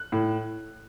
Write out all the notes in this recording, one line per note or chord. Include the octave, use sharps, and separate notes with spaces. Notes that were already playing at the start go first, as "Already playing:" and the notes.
Already playing: F#6
A2